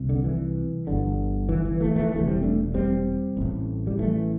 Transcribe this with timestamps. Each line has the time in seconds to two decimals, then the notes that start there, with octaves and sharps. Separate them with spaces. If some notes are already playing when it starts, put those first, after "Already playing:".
Already playing: C2 C3
0.09 D3
0.24 E3
0.87 G1 G2 D3
1.49 E3
1.65 E3
1.80 E3 A3
1.96 E3 A3
2.11 E1 D2 C3 E3 A3
2.27 G3 C4
2.43 A3 D4
2.74 G3 C4
3.37 A1 A2
3.87 G3
3.99 E3 A3